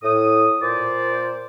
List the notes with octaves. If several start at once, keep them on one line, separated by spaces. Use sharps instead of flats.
A2 D#6
A#2 C5 D5